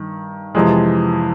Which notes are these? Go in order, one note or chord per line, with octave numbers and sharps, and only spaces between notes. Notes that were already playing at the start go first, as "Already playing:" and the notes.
Already playing: G2 D#3
F2 C3 E3 G#3